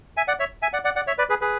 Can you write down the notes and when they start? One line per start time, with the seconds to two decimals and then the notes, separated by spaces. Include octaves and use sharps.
0.17 E5 G#5
0.28 D5 F#5
0.39 C#5 E5
0.62 E5 G#5
0.73 D5 F#5
0.85 D5 F#5
0.96 D5 F#5
1.07 C#5 E5
1.18 B4 D5
1.30 G#4 B4
1.41 G#4 B4